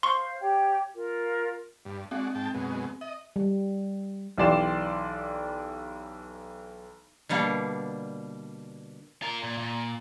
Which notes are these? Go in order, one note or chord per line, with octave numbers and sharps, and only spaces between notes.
C5 F5 C6 C#6
G4 C#5 G5
F4 A#4
G2
G#3 C4 D4 F#4
G#2 G5 A5
F#2 B2 G#3
D#5 E5
G3
B1 E3 G4 D5 C6 E7
B2 D3 G3 A#3
F4 A#4
A#2
A#2